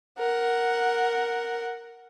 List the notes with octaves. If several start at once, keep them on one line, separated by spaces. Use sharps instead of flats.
A#4 F#5